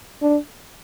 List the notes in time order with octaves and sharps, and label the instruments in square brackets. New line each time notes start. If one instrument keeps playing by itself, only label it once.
[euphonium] D4